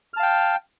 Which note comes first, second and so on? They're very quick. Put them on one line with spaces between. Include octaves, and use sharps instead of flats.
F6 A5 F5 G5